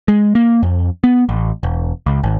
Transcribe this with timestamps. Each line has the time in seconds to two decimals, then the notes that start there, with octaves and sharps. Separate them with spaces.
0.08 G#3
0.35 A#3
0.63 F2
1.04 B3
1.29 A1
1.63 E1
2.06 C#2
2.23 G#1